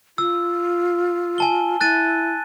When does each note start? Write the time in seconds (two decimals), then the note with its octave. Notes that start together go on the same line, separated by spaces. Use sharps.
0.18 F4 E6
1.38 G#5 A5 G7
1.81 E4 F#6 A6 D#7